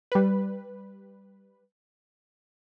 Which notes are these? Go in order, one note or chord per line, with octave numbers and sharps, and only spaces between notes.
G3 B4